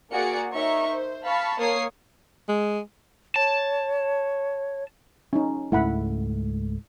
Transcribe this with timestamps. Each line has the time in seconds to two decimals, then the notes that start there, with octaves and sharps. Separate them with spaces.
0.11 A#3 F#4 G#4 D5 C#7
0.53 D#4 A#4 C#5 E5 C#6
0.90 C5
1.24 F5 A5 B5 C#6
1.58 A#3 C#5 D#6 C7
2.49 G#3
3.36 C#5 A5
5.33 C#4 D#4
5.72 C#2 G#2 A3 E4 F#5 B5